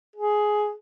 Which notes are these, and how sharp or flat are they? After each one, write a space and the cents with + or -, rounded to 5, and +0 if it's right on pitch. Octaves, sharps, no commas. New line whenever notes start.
G#4 +10